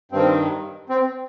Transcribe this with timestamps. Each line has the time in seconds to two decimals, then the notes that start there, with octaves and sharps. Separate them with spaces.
0.11 G2 D#3 C4
0.89 C4